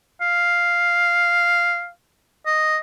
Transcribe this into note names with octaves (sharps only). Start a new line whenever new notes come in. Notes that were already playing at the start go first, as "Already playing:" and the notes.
F5
D#5